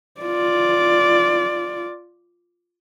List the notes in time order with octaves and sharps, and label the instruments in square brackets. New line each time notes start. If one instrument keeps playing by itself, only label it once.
[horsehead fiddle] F4 D5